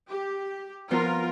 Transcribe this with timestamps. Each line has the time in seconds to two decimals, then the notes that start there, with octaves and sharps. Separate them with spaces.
0.10 G4
0.91 F3 B3 F4 A#4 C5